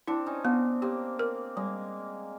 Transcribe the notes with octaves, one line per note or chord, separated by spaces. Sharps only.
C4 D4 E4
C#4 D#4
B3 C4 D4
A#3 C4 G4
A#4
G3 G#3 A#3